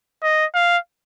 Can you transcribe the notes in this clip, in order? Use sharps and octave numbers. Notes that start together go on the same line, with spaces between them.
D#5
F5